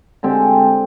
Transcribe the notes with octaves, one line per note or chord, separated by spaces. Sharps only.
D3 G#3 C4 G4